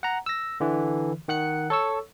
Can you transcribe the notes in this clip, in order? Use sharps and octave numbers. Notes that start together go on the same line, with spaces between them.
F#5 A#5
E6 A#6
D3 E3
D#3 F#5 F#6 C#7
A4 C#5 C#6 E6